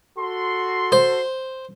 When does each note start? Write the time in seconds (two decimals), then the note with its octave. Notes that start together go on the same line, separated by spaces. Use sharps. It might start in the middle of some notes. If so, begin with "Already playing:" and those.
0.18 F#4 A4 C6
0.92 C5